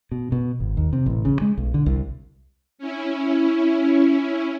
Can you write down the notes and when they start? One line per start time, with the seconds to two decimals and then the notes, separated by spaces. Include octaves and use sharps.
0.12 B2
0.32 B2
0.60 G#1
0.77 D#2
0.93 C3
1.06 A1
1.25 C#3
1.41 G#3
1.58 B1
1.74 D3
1.86 C2
2.78 C#4 E4